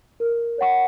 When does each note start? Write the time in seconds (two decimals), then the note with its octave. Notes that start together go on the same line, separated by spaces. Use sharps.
0.20 A#4
0.58 C#5 F#5 C#6